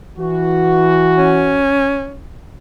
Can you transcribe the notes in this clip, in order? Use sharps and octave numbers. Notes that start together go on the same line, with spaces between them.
E3 F#4
C#4